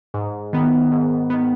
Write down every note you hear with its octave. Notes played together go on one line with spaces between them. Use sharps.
G#2
D#3 B3
G#2
D#3 B3